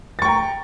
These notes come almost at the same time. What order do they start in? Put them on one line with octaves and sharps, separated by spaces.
A6 C#6 G5 A#5